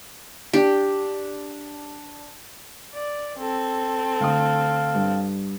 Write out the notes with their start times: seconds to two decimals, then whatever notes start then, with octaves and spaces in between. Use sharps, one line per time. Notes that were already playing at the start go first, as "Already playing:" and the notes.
0.53 D4 G4
2.94 D5
3.38 C4 A4
4.20 D2 F5 D#6
4.94 G2